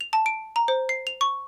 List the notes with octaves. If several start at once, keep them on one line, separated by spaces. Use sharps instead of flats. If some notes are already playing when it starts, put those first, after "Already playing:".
F7
A5
D7
A#5
C5
C7
F7
C#6